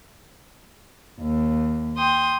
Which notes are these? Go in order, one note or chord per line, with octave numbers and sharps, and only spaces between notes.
D#2
G5 C6 D#6